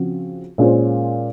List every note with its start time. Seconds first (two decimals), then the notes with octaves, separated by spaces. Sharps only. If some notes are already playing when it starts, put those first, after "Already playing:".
Already playing: C#3 F3 C4 F#4
0.58 A#2 G#3 C#4 F4 C5